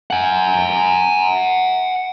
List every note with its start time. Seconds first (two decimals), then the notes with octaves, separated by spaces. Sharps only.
0.10 F#5 G#5